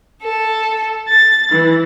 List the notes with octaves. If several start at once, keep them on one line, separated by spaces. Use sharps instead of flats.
A4
A6
E3